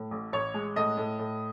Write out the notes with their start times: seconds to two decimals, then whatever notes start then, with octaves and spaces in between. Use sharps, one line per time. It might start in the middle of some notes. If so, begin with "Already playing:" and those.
Already playing: A2
0.11 A1
0.33 A1 C#5
0.54 G#3
0.76 A2 D#5
0.97 A2
1.19 A2